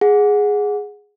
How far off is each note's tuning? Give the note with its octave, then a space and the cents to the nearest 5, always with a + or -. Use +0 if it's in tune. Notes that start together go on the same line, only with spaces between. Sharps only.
G#4 +0 F#5 -20